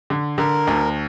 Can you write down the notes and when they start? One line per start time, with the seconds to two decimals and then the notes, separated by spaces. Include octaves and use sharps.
0.10 D3
0.38 D3 A#4
0.67 D2